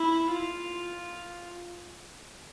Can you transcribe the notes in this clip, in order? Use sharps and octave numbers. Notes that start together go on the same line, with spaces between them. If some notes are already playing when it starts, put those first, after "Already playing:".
Already playing: E4
F4